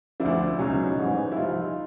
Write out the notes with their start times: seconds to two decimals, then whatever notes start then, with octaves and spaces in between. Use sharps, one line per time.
0.20 D2 D3 F3 D4 E4
0.59 C#2 B2 F#3 C#4 D#4
0.98 A1 G#2 E3
1.32 E4
1.36 C2 C3 F3 D#4 F4